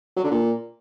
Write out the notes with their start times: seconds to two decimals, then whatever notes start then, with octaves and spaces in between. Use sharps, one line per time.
0.17 F#3
0.24 D3
0.31 A#2